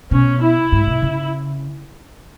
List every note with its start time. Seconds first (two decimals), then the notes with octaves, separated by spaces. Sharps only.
0.11 B2 C#4
0.42 E4
0.72 G#2
0.87 B2
1.02 C#3